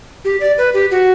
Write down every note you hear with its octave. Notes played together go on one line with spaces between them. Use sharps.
G4
D5
B4
G4
F#4